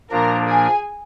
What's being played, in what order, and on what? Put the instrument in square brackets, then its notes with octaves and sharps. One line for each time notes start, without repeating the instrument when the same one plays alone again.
[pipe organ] A#2 F3 A#3 D4 [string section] A#4 A#5
[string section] G#4 G#5